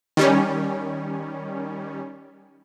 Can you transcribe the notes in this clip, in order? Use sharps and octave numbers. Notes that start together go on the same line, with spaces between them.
D#3 G3 C#4